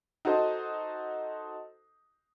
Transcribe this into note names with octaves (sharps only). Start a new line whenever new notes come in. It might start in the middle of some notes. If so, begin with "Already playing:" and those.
D#4 F#4 A4 C5 D#5